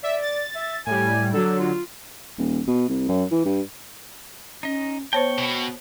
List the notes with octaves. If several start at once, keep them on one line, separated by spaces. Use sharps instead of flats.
D5 E5
A6
E5
A2 G3 G#5
D3 F#3 A4
F4
D#1
B2
C2
F#2
E3
G2
C#4 D#4 D#5
B3 C5 C#5 G5 A5 C#6
B2